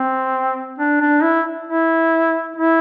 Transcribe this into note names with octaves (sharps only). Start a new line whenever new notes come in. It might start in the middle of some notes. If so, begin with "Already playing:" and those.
Already playing: C4
D4
D4
E4
E4
E4